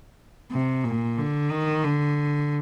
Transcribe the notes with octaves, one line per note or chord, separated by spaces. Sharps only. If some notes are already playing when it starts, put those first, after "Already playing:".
C3
A#2
D3
D#3
D3